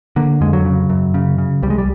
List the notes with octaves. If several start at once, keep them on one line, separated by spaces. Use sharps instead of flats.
D3 A#3
F2 G#3
F#3
C#3
F#2
C#3
C#3
C2 G3
G#3
G3